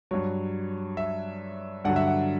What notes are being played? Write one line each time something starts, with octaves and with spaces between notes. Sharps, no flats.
G2 F#3 C#5
E5
G2 D3 F#3 F#5
E5
F#5